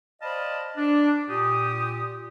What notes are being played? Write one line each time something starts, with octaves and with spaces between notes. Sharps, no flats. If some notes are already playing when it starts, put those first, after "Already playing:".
C5 D5 D#5 F5 A5 B5
D4
A#2 G4 D#6